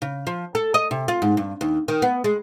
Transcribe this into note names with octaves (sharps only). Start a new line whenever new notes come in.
C#3
F3
A4
D#5
C3
F4
G#2
G2
D#2
D#3
B3
G#3